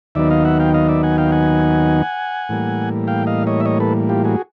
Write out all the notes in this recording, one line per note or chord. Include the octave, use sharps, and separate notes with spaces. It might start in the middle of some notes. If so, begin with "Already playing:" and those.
D#2 D#3 F#3 B3 D#4 D5 E5
D#5 F5
E5 F#5
F5 G5
D#5 F5
D5 E5
F#5 G#5
F5 G5
F#5 G#5
A2 E3 G3 A#3
F5 G5
D#5 F5
C#5 D#5
E5
C#5 D#5
A4 B4
F4 G4
F#4 G#4